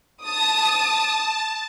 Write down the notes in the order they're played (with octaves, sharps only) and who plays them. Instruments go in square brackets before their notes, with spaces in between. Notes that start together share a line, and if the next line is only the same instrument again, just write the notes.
[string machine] A5 [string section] D#6